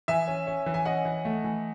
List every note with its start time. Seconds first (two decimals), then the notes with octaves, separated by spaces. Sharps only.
0.08 E3 E5 G#5
0.28 C#4
0.47 C#4
0.66 E3
0.74 G#5
0.85 C#4 D#5 F#5
1.05 E3
1.25 A3
1.44 E3